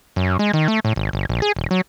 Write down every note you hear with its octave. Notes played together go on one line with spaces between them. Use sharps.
F#2
G#3
D#3
A3
A2
G#1
G1
A#1
G#4
D#1
F#3